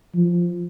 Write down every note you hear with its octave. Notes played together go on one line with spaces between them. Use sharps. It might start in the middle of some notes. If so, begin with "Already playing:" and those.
F3